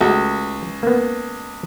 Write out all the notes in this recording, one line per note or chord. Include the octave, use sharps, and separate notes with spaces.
C#2 A3 F#4
A#3 B3